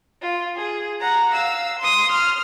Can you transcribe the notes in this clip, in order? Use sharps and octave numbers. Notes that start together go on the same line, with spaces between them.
F4
G#4
F#5 A#5
F5 E6
C6 D#6
F6